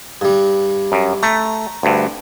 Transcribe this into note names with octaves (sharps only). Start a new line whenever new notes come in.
G2 G3
F#2
A3 A#5
D2 G2